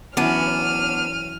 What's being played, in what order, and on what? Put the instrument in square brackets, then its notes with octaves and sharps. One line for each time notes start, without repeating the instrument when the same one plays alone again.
[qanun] E3 F#3 C#4 [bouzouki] B3 D4 [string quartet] F6 [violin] D#7